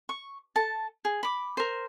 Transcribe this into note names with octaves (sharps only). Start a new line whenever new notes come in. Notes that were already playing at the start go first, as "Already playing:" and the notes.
C#6
A4 A5
G#4
B5 D6
A#4 C5